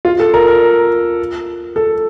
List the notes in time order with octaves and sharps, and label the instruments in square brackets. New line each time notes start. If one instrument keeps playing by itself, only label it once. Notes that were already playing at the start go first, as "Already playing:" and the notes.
[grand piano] F4
A4
A#4
A#4
A4